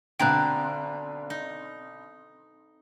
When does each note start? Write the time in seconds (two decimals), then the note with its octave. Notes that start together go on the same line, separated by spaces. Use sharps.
0.20 B1 B2 D3 C4 G5 A#5 F#6
1.30 D#4